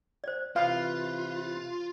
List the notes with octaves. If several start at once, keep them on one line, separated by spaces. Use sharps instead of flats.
C5 D5
C3 E3 F4 B4 F5